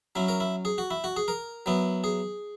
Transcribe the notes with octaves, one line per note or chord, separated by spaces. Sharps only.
F#3 C#4 E4
A#4
E4
G#4
F#4
E4
F#4
G#4
A#4
F#3 B3 E4
G#4